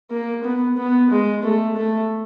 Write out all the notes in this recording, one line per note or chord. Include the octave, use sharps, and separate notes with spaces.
A#3
B3
B3
G#3
A3
A3